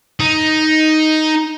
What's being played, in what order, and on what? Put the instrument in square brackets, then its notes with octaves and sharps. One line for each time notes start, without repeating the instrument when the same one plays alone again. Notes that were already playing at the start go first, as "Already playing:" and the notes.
[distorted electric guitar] D#4